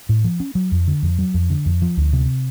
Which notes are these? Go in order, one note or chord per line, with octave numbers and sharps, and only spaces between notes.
A2
F3
C#4
F#3
F2
D3
F2
F#3
F2
D3
F2
F3
D2
C3